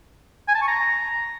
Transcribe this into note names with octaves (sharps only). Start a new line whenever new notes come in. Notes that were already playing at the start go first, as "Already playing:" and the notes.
G#5
A5
C#6
A#5